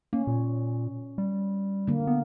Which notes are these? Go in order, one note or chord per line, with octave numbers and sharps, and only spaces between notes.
A#3 C#4
A#2
G3
D3 A#3
B3